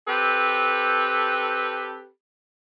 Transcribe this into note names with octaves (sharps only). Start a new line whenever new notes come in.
C4 G4 A4 B4